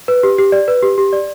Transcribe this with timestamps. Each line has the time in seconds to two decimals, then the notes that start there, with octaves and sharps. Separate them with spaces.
0.08 B4
0.23 G4
0.38 G4
0.52 D5
0.68 B4
0.82 G4
0.98 G4
1.13 D5